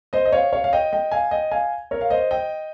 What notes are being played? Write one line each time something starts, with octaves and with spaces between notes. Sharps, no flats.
C5 D#5
D#5
C#5 F5
C#5 F5
F5
D#5 G5
D#5 G5
F5 G#5
D#5 G5
F5 G#5
A#4 C#5
F5
C5 D#5
D#5 G5